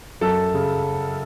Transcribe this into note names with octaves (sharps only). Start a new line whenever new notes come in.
F#2 A4
C#3